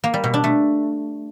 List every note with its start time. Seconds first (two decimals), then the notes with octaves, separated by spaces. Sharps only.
0.04 A#3
0.14 G3
0.24 B2
0.34 D4
0.44 A3